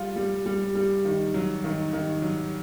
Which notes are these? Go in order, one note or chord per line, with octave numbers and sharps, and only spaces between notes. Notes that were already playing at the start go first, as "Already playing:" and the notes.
Already playing: G3 F4
G3
G3
G3
D#3
F#3
D#3
D#3
F#3